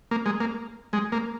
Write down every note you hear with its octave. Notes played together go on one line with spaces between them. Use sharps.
A#3
G#3
A#3
G#3
A#3